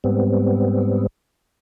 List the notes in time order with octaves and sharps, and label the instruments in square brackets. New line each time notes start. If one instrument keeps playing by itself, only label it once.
[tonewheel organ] G#2 G3 B3 C4